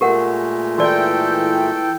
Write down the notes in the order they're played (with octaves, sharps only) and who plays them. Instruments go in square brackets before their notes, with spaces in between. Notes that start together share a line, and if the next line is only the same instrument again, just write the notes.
[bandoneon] A#2 G#3 A3 [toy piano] G4 A#4 F#5
[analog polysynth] E3 G5 [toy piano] F#4 D5 [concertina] A4